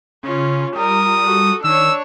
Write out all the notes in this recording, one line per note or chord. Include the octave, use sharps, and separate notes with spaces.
C#3 C#4 F4
G3 F4 A#4 D#6
F#4 A4
D#3 D4 C#5 E6